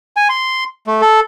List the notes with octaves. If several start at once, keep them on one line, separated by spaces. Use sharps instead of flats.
G#5
C6
A3
A4